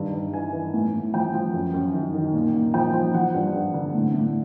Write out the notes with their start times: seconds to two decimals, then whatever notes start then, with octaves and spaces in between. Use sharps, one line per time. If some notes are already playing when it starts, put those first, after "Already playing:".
Already playing: G2 D#3
0.14 G2
0.34 E3 G#5
0.53 E3
0.74 A2
0.93 A2
1.14 F3 G5
1.34 F3
1.54 F#2
1.74 F#2
1.94 D#3
2.14 D#3
2.34 A#2
2.54 A#2
2.74 F3 G5
2.94 F3
3.14 F3 F#5
3.34 G2
3.54 G2
3.74 D3
3.94 A2
4.14 A2